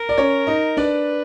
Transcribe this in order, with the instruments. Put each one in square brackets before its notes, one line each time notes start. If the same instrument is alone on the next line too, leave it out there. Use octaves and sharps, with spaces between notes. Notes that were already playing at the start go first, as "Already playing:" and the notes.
Already playing: [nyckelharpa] A#4
[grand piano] D5
C#4 C#5
D#4 D#5
[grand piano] D4 D5 [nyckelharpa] B4